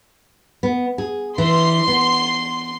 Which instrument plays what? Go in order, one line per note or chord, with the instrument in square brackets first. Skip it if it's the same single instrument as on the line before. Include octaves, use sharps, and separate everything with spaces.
[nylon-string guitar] B3
G#4
[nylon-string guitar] E3 [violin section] C6
[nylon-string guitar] B3